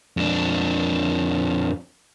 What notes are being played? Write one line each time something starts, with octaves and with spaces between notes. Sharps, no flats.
F2 D4